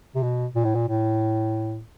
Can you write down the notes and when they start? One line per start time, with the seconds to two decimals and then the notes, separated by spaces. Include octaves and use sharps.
0.15 C3
0.23 B2
0.55 A#2
0.65 A2
0.75 A#2
0.88 A2